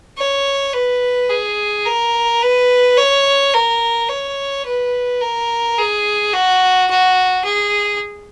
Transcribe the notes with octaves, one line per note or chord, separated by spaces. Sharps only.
C#5
B4
G#4
A#4
B4
C#5
A#4
C#5
B4
A#4
G#4
F#4
F#4
G#4